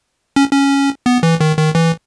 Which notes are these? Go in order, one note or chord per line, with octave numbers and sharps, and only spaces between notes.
C#4
C#4
B3
E3
D#3
D#3
E3